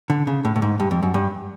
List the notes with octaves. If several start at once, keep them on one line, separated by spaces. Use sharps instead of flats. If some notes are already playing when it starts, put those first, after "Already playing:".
D3
C#3
A2
A2
G#2
G2
F2
F#2
G2